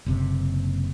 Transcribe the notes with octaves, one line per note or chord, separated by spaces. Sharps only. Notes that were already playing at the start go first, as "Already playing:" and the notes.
F#1 C3